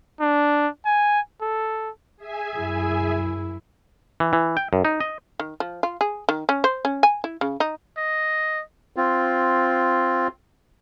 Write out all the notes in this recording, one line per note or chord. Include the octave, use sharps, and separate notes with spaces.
D4
G#5
A4
G#4 E5 G#5
F#2 E4
E3
E3
G5
F#2
D#4
D#5
D#3
F3
F4
G#4
D#3
C#4
C5
C#4
G#5
E4
C#3
D#4
D#5
C4 F4